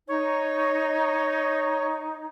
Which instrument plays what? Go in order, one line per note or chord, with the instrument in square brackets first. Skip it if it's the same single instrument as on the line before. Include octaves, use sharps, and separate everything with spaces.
[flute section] D#4 [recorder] C#5